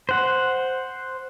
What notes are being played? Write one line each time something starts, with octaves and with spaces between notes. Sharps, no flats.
C5 F#5